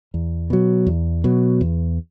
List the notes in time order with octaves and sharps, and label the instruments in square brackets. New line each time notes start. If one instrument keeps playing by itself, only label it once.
[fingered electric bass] E2
B2 F#3
E2
B2 F#3
E2